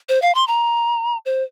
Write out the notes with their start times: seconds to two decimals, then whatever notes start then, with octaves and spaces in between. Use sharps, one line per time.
0.09 C5
0.22 F5
0.35 C6
0.48 A#5
1.26 C5